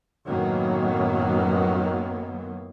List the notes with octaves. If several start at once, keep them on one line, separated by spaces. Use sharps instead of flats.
F#2 A2 D#3 F#3 A#3 B3